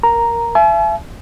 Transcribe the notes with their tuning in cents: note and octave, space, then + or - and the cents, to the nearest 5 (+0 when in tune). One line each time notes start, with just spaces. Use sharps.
A#4 +0 A#5 +0
E5 +35 G#5 +45